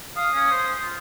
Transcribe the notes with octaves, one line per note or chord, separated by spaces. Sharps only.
F5 D#6
C#4
C5
F4